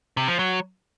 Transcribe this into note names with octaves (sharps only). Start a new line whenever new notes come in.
C3
F3
F#3